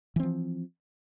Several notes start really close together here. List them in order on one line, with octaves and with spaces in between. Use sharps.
E3 C4 F3